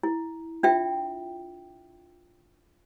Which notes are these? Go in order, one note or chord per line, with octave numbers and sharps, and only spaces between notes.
E4
D4 F4 E5 G5